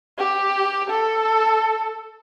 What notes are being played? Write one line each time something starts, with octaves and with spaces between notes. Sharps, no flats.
G4
A4